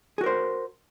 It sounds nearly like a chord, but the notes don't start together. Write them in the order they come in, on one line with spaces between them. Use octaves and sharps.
G#4 F#4 A#4 C5